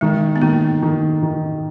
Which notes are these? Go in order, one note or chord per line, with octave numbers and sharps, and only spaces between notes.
D#3 G#3
B3
D#3 A#3
D#3
D#3